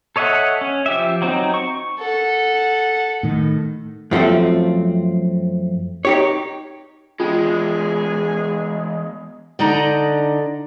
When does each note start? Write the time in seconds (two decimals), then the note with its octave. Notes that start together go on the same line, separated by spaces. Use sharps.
0.16 A4 C#5 D#5 E5 F#5
0.61 C#4
0.86 F3 G4 E5
1.22 F#3 C4 D#4
1.54 C#6
1.99 A4 F#5
3.23 A2 D#3
4.11 F#2 F3 A3 C4
6.05 D#4 G4 C#5
7.20 E2 G#3 C#4 F4 G#4
9.59 D3 D#4 D5 D#5 A#5